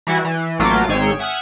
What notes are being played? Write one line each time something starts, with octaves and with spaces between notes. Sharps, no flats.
E3 G3 E4 F#4
E3
A1 F#3 A3 A#3 F4 D6
G#1 G#2 G#4 C#5 G5 E6
E5 F#5 G#5 D#6 F6